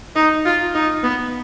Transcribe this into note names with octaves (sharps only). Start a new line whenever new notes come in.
D#4
F4
D#4
B3